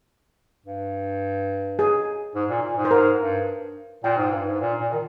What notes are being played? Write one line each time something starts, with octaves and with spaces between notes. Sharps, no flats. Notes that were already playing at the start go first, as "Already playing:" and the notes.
G2
G#4
G#2
A#2
A#2
G#2
C5
G#2 A#4
G2
A#2 G5
G#2
G2
G#2
A#2
A#2
D#3